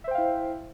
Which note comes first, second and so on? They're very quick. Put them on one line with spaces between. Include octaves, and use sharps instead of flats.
E5 C5 G5 F5 E4